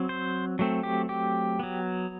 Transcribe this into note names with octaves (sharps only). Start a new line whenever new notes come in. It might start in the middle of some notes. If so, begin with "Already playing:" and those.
Already playing: F#3 C4
C5
F#3 A3 C4
G4
G4
F#3 B3